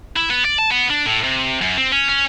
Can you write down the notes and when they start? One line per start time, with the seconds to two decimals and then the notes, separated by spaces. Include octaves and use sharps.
0.16 E4
0.30 B3
0.45 D5
0.58 A5
0.71 B3
0.90 D4
1.06 A2
1.24 C3
1.62 F#2
1.77 C4
1.92 C#4
2.09 C#4